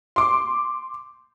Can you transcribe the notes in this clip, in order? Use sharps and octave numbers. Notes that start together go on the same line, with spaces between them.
C6 D6